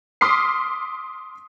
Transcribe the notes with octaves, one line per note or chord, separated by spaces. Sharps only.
C6 D6 D#6 F6 B6 C7